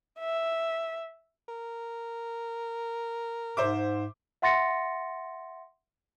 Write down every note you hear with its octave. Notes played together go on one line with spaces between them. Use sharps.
E5
A#4
G#2 C5 E5 D6
E5 F#5 C6 A6 A#6 C#7